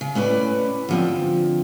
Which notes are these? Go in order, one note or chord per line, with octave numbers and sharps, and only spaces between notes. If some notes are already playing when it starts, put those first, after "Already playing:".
C#3
A2 C#4 B4 D5
D3 F3 C4